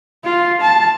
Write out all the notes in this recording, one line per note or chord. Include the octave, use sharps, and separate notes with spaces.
F4
A5